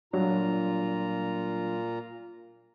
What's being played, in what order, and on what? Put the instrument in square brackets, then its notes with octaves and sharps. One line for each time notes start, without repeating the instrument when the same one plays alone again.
[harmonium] A#2 F4 A#5 [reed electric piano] F#3 G3 D4